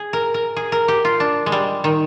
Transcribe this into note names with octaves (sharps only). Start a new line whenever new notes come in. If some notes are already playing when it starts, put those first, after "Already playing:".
Already playing: G#4
A#4
A#4
G#4
A#4
G4
F4
D4
G#3
G3
D#3